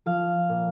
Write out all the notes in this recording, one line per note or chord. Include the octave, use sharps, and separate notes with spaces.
F3 F5
A#2